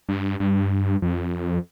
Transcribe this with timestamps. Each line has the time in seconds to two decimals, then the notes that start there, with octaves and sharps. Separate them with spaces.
0.09 G2
0.40 G2
1.02 F2